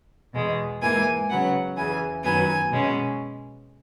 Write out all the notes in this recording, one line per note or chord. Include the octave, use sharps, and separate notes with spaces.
E2 B2 G#3
G#2 E3 A#3 G#5
C#3 F#3 B3 F#5
E2 C#3 E3 G#5
F#2 D#3 F#3 B3 G#5
B2 G#3 C#4